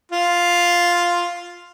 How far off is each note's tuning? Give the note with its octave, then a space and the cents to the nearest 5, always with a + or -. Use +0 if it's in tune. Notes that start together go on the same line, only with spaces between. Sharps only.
F4 +0